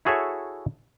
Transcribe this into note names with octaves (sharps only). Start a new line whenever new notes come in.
E4 F#4 G#4 A4 C#5 E5